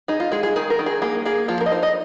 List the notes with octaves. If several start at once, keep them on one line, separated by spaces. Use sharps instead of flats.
D#4 G#4
F4
G#3 G#4
G#4
D#3 G#4
A#4
D#3
G#4
A#3 G#4
A#3 G#4
F3 F4
A#4
D#5
D#4 C5
D#5